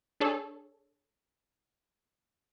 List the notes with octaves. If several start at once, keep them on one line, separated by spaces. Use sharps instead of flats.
D4 G#4 A4 C#5